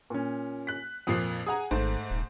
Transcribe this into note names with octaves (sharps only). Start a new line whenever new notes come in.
A#2 C#4
F#6 B6
F2 A#2 F3 D#6 F#6 C7
G#4 F#5 G#5 A#5 D#6
G#1 G#2 A3 C5
D#1